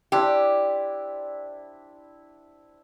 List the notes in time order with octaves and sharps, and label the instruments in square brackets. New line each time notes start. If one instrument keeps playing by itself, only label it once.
[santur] D4 E4 C5 [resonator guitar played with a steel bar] G4